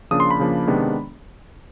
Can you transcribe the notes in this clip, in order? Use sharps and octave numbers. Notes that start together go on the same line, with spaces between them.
C#3 F3 A#3 D4 D#6
C6
B5
C#3 F3 A#3 D4
C3 D#3 G#3 B3 D4